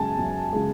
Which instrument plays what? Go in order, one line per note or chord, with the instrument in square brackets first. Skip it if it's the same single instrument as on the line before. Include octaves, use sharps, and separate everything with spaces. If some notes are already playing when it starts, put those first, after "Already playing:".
Already playing: [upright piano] F#2 C#3 G#3 G#5 A5
F#2
C#3 G#3